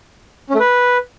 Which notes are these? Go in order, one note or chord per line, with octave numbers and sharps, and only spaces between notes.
C#4
A3
B4